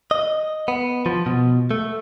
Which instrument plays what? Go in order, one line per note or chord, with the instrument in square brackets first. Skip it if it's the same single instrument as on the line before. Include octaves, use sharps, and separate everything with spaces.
[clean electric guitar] D#5
B3
F3
B2
A3